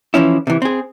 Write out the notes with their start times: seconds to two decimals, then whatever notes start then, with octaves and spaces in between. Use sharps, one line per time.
0.14 E3 F3 C#4 E4
0.47 C3 E3
0.62 C4 G#4